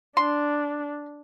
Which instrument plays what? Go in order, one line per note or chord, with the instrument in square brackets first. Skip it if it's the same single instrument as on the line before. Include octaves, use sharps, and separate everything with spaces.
[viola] D4 [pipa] C6